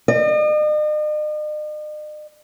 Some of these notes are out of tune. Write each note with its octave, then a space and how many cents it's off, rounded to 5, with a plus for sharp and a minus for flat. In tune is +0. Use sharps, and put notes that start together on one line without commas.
D#5 -45